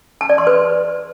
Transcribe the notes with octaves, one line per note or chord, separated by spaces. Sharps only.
A5
D5
C6
B4